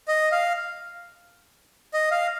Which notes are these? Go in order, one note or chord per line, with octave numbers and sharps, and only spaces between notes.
D#5
F5
D#5
F5